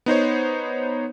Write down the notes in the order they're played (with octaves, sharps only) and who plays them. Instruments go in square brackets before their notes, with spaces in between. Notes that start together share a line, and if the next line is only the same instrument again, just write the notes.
[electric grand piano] B3 D#4 C5 C#5